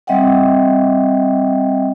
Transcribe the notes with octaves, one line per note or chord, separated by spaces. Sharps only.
G3 C4 D#5 E5 F#5 G5